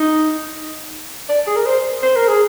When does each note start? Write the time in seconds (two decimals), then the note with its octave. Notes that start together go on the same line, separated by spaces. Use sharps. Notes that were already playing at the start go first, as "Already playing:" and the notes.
Already playing: D#4
1.29 D5
1.47 G#4
1.56 A#4
1.66 C5
2.03 C5
2.16 A#4
2.28 G#4